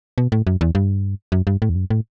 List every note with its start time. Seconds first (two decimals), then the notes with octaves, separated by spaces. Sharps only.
0.18 B2
0.32 A2
0.47 F#2
0.61 E2
0.75 G2
1.32 F#2
1.47 G2
1.62 A2
1.69 E2
1.75 F#2
1.90 A2